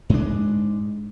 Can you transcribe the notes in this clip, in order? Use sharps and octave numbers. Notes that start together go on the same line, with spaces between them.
G#2 G#3 D4